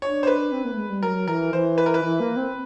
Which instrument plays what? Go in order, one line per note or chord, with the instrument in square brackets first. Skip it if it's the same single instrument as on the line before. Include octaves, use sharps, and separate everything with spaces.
[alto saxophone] D4 [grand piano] C#5
[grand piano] C5
B4
[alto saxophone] C4
A#3
A3
G#3
G3
[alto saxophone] F#3 [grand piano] A#4
[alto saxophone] E3 [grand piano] A#4
[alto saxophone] E3 [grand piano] C5
[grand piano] B4
A#4
B4
[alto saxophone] E3
A#3
C4